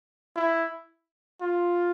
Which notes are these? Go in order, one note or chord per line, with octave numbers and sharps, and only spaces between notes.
E4
F4